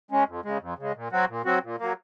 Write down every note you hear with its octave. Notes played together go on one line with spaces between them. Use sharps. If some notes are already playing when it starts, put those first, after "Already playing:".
G#3 C#4
F2
C#3 G#3
F2
C#3 G#3
A#2
F#3 C4 F#4
A#2
F#3 C4 F#4
A#2
F#3 A#3